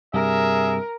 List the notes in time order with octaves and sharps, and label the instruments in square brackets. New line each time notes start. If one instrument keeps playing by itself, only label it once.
[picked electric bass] G2 C3 G3 [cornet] G#4 [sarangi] A#4 [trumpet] E5